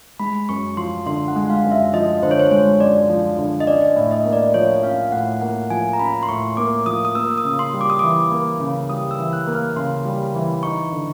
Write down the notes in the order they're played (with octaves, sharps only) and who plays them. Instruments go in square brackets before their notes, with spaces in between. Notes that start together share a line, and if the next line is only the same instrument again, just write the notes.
[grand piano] G#3 [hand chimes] B5
[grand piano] F#2 [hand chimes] C#6
[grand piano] F3 [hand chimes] C6
[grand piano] D3 [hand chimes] C6
[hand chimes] F#5
[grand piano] G#3
[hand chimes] F5
[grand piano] F#2
[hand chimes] E5
[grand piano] F3 [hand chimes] D#5
[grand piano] D3 [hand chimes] C5
[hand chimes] C#5
C5
[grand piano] G#3 [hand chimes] C#5
[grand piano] F#2 [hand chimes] D5
[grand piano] F3
D3
[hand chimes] D#5
[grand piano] C#4 [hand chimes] D5
[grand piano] A2
[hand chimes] D#5
[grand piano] A#3
[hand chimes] D5
[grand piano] F3 [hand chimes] C#5
[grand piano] C#4 [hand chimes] F5
[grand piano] A2 [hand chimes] F#5
[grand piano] A#3 [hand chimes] F#5
[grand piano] F3 [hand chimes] G#5
[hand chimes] A#5
[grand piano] C#4 [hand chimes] B5
[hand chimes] C6
[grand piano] A2 [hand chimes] C#6
[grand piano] A#3 [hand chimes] D6
[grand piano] F3 [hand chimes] D#6
[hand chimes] D#6
[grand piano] A#3 [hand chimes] E6
[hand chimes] D#6
[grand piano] C#3
[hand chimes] C6
[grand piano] G3
[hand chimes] D6
D#6
[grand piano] E3 [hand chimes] D6
[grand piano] A#3
C#3
[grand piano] G3 [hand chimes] D#6
[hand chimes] E6
[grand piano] E3
[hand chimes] F#6
[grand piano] A#3
[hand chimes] F6
[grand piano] C#3 [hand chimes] C6
[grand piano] G3
E3
[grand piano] D#4 [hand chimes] C#6
[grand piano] D3